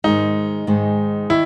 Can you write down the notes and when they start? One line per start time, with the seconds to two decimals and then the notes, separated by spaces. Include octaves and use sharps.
0.04 G#2 D#3 G#3 D#4
0.67 G#2 D#3 G#3
1.30 D#3 E4